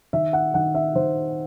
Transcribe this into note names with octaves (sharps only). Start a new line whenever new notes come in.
D#3 E5
F#5
D#3 F#5
E5
D#3 C5